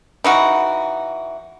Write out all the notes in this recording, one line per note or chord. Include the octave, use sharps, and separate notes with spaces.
E3 D#4 F#4